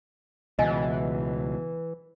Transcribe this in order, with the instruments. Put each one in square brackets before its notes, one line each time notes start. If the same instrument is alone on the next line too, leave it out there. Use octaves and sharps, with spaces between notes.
[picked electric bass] C#2 B2 [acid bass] E3 [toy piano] D#5 G#5